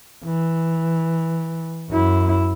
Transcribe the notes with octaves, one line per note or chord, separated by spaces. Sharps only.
E3
F#2 E4